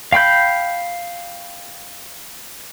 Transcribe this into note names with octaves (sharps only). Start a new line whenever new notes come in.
F5 G5 B5 G6